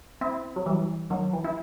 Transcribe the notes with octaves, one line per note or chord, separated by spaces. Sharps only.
C4 E4
F#3
E3 G3
D#3 F#3
E3
E4